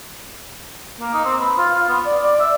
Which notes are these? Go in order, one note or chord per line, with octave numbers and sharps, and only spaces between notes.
A#3
D#4
C4
B4
F4
F4
B3
D5
D5
E5